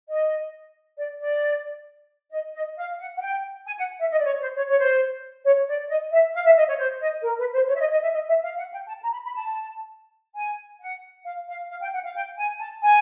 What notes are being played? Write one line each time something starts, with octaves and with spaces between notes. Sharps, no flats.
D#5
D5
D5
D#5
D#5
F5
F#5
F#5
G5
G#5
F#5
E5
D#5
D5
C#5
C5
C#5
C#5
C5
C#5
D5
D#5
E5
F5
E5
D#5
C#5
C5
D#5
A#4
B4
C5
C#5
E5
D#5
D#5
E5
D#5
E5
F5
F#5
G5
A5
A#5
B5
B5
A5
G#5
F#5
F5
F5
F5
G5
F#5
F5
G5
G#5
A5
G#5